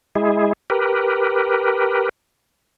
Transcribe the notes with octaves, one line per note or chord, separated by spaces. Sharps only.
G#3 E4 G#4
G4 A#4 B4